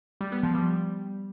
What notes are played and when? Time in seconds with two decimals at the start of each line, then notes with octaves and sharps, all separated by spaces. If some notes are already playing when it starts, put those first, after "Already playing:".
0.21 G3
0.32 B3
0.43 F3
0.55 G3